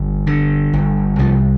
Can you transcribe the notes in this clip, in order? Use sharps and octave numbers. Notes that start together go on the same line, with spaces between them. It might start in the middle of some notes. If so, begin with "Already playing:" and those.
Already playing: G1
D3
G1
C2 F3